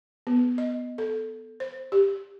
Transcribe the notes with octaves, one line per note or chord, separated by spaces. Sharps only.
B3
D#5
A4
C5
G4